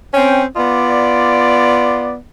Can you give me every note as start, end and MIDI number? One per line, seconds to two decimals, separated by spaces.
0.14 0.44 60
0.14 0.44 61
0.14 0.44 79
0.57 2.15 59
0.57 2.15 65
0.57 2.15 74